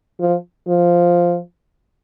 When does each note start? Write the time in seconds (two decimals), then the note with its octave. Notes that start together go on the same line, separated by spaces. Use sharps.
0.20 F3
0.68 F3